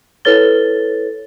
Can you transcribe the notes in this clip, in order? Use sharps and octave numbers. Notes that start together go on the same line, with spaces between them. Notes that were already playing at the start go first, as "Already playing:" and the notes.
E4 A4 B4 C#5 A6 G7